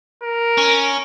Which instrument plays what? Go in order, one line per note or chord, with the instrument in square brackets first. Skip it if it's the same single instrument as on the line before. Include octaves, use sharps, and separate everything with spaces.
[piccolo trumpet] A#4
[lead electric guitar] C#4